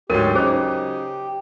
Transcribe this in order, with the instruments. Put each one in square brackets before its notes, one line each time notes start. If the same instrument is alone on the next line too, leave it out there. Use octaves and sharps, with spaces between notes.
[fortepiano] D2 G#2 [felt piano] F#3 G#6 D#7 [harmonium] G4 [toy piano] A#4
[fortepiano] C#3 D#4 [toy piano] G#4 C5